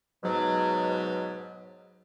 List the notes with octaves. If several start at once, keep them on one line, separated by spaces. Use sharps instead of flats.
G#2 B2 F#3